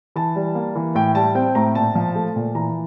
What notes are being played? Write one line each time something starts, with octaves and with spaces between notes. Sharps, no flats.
E3 A5
G3
A#3
E3
A2 G5
G3 A5
C4 G5
A2 A#5
A#2 A5
F3
A3
A#2
E3 A#5